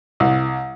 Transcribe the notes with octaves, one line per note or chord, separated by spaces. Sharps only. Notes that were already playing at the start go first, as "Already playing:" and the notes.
C2